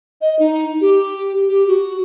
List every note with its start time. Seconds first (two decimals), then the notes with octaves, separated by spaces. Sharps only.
0.21 D#5
0.39 D#4
0.81 G4
1.49 G4
1.68 F#4